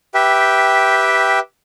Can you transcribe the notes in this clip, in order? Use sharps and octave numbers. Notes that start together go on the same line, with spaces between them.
G4 B4 E5 G5